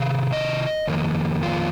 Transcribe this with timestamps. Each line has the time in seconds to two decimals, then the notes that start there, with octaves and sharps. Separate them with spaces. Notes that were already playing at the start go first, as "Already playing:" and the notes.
Already playing: C3 D#3 F5
0.32 D#5
0.87 F2 D#3 A#3
1.43 F4